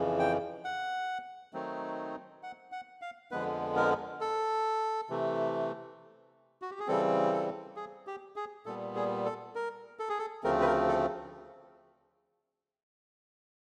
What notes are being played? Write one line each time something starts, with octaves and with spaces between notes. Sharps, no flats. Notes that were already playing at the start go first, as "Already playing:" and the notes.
Already playing: F2 C#3 E3
G5
F#5
D#3 F#3 A3 C4 D#4
F#5
F#5
F5
F2 D3 F3 G#3 B3 B4
A#4
A4
C3 E3 A3
F#4
G4
G#4
C#3 E3 G3 C4 A4
A4
G#4
G4
G#4
A#2 G3 B3 A4
G#4
A4
A#4
A4
G#4
A4
D2 C#3 F3 A3 C4 A#4
B4
A#4
A4